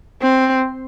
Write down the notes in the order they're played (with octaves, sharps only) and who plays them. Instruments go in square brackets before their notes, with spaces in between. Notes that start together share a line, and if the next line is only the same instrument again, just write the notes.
[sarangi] C4